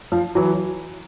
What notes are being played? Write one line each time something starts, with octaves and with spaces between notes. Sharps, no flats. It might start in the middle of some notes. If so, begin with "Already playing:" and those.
F3
E3 F#3